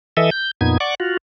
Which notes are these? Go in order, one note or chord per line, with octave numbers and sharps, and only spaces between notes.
E3 A4 D#5 E5
G6
F2 A#2 B3 D#4 G#6
D5 F#5 C#6 D6
F4 F#4